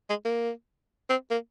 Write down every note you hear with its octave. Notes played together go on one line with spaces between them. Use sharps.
G#3
A#3
C4
A#3